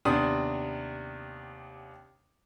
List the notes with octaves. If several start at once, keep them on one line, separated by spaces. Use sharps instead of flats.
D#2 C3 B3 D4 C6 D#6